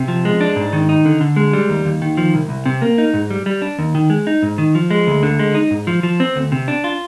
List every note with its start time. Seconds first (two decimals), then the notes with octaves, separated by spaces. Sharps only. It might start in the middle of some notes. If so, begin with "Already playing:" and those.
Already playing: C3
0.08 F3
0.25 G#3
0.41 D4
0.56 G#2
0.73 D#3
0.89 D#4
1.05 D3
1.21 D3
1.36 G#3
1.53 G3
1.69 D#2
1.85 D#2
2.02 D#3
2.18 F3
2.34 C2
2.49 C2
2.66 C3
2.82 A#3
2.98 D#4
3.14 G#2
3.31 G3
3.46 G3
3.62 D4
3.79 D#2
3.95 D#3
4.10 G#3
4.27 D#4
4.43 G#2
4.58 D#3
4.75 F3
4.91 G#3
5.07 D2
5.23 D3
5.39 G#3
5.55 D#4
5.71 G#2
5.87 F3
6.03 F3
6.20 C4
6.36 D2
6.52 C3
6.68 D4
6.84 F4